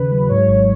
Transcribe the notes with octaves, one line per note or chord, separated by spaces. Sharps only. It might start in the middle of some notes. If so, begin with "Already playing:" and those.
Already playing: D#2 C#3 B4
F#3
G#2 C#5
G#1